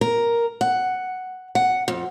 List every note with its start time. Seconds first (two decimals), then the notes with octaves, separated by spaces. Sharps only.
0.01 A#4
0.61 F#5
1.55 F#5
1.88 F2